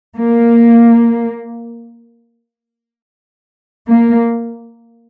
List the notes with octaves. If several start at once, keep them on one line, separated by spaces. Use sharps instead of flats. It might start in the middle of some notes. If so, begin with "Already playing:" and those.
A#3
A#3